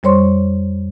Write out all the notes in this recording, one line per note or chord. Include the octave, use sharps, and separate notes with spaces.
F2 G3 C5 C#5 C6 C#6